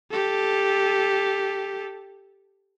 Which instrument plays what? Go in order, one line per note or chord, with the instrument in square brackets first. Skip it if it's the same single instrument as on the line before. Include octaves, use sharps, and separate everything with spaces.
[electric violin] G4 A4